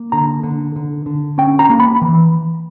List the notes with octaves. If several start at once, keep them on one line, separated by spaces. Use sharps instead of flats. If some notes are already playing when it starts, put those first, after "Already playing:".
Already playing: A#3
D3 A#5
D3
D3
D3
C#4 G5
A#5
A#3
B5
E3